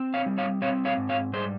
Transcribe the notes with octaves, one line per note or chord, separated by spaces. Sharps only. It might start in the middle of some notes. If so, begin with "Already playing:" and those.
Already playing: C4
C#5 F5
G3
C#5 F5
C4 C#5 F5
C#5 F5
G#2
C#5 F5
G3 G#4 C5